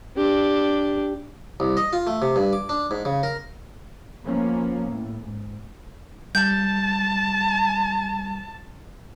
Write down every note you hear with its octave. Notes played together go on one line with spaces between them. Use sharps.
D4 G4
C2
D#5
F4
A3
C3
G2
D6
D4
G#2
C#3
A#4
F3 A#3 B3 C#4
A2
G#2
G3 A5 G6